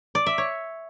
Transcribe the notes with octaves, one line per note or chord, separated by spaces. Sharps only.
D5
E5
C#5